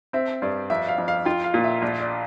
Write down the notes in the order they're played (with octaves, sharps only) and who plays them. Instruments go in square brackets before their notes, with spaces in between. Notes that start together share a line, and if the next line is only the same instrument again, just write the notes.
[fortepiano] C4 [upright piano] E5
[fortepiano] G2 [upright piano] D5
[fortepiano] F2 [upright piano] E5
[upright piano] F5
[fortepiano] F2
[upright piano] F5
[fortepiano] F4 [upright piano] G5
[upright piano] F5
[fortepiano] A#2
[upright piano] E5
[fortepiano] A#1 [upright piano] D5
[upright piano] D5